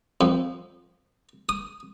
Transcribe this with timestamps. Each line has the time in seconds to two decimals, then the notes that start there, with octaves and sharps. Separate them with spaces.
0.21 F2
1.49 D#6